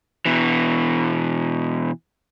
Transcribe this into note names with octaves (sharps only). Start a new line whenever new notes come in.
B2 E3